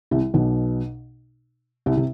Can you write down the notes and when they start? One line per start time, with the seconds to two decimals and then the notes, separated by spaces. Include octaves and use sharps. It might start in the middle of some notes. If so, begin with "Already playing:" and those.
0.11 C2 C3
0.34 B1 B2
1.86 C2 C3
1.97 C3